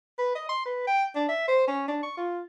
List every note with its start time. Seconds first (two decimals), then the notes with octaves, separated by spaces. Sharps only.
0.19 B4
0.35 D#5
0.49 C6
0.66 B4
0.87 G5
1.16 D4
1.29 E5
1.48 C5
1.68 C#4
1.88 D4
2.03 C#6
2.18 F4